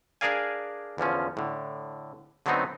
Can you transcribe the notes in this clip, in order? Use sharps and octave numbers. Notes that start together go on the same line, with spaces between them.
D4 G#4 A#4 D5 F5 G#5
E2 D3 F3 C#4
A2 D3
D3 F#3 A3 B3 C4 D#4